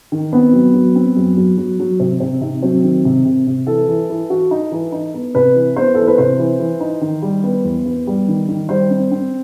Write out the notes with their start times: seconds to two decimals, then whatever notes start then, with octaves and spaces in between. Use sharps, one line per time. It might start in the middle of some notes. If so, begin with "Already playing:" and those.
0.12 D#3
0.33 B3 C4
0.53 F#3
0.74 F#3
0.96 C4
1.16 F#2
1.37 F#3
1.58 F#3
1.80 F#3
2.00 C3 C4
2.20 C3 C4
2.41 C3 D#4
2.62 F#3 C4
2.83 D#3
3.05 C3
3.25 C3
3.47 C3
3.67 E3 A4
3.88 E3
4.10 E3
4.30 F#4
4.51 D#4
4.72 E3
4.92 D#4
5.14 B3
5.35 C3 B4
5.56 E3
5.76 B3 C5
5.95 E3 A4
6.07 B4
6.18 C3 C5
6.40 E3
6.60 E3
6.81 D#4
7.01 D#3
7.22 G3
7.44 B3
7.65 E2
7.86 B3
8.07 G3
8.28 D#3
8.49 D#3
8.69 G3 C5
8.90 C4
9.11 C4